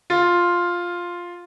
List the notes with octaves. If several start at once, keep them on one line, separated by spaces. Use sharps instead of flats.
F4